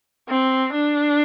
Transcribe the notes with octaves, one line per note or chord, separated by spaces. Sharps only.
C4
D4